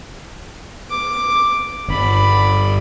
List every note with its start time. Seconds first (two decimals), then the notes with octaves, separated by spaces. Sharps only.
0.91 D6
1.88 G1 D5 B5